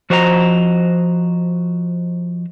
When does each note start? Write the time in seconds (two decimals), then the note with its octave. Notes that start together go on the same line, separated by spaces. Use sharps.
0.10 F3 F#4 C5 D#5 G5 A#5